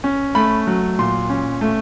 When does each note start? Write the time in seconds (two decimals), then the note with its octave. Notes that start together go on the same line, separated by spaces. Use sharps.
0.04 C#4
0.35 A3 B5
0.67 F#3
0.99 A#2 C6
1.30 C#4
1.61 A3